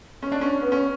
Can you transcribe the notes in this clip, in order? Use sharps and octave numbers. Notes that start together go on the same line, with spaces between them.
C#4
D4
C#4
B3
C#4